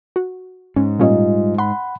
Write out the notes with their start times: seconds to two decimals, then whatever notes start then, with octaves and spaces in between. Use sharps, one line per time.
0.16 F#4
0.76 G#2 C#4
0.99 A#2 G3 C#4 F4 D#5
1.58 F#5 B5 C6